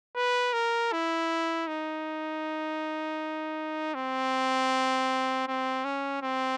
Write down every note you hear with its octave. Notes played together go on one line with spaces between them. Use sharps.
B4
A#4
E4
D#4
C4
C4
C#4
C4